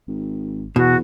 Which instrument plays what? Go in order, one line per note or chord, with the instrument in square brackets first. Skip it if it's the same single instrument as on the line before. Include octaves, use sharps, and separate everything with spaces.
[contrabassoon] G#1
[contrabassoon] E2 [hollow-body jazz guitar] B2 [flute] F#4